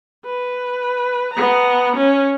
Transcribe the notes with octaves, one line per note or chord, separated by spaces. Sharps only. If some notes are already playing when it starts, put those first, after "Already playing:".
B4
B3 A#5
C#4